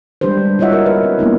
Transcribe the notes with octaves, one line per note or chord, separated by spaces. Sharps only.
G3 G#3 D4 G4 B4 C5
E4 F4 C#5 D#5 E5 F#5
F#4 A#4 D#5
B4
G3 C4
A#3 B3 D4 E4